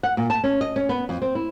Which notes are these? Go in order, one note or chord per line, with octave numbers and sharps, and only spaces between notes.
F#5
A#2
A5
C#4
D#5
C#4
B3
F2
C4
E4